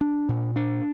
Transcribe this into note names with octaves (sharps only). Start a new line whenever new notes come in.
D4
A#2
D4